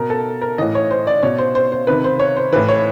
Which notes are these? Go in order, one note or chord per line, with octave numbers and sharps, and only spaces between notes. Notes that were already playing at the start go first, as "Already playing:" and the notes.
Already playing: B2 A#4
A4
A#4
A2 E3 D#5
C#5
C5
D5
B2 C#5
C5
C5
C5
C3 D#3 B4
C5
C#5
C5
A2 E3 B4
C#5